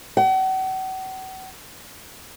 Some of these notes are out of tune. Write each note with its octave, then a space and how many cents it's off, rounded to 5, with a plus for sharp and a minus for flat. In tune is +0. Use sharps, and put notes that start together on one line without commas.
F#5 +40